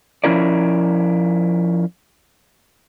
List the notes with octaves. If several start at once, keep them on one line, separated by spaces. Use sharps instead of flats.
F3 F#3 C#4 E4 A#4 D5